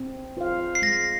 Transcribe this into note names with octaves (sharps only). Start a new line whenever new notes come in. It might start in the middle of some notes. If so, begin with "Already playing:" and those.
Already playing: C4
F4 C5 F5
C7
G#3 A#6